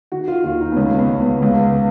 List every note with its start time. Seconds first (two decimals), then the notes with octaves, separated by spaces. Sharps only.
0.12 D#3 F#4
0.28 F4
0.44 D#2 F4
0.61 D#4
0.72 B3
0.76 C#2 C#4
0.99 B3
1.09 C#2
1.20 B3
1.42 C#2